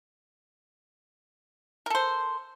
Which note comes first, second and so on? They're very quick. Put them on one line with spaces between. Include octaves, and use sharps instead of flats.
A#4 A4 C5